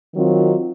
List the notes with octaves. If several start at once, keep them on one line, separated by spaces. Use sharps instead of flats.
D#3 F#3 C4 F4